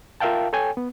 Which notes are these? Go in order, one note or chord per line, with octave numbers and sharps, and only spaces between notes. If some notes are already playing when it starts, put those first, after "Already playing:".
F4 A#4 E5 F5 G5 A5
A4 C#5 G5 G#5
B3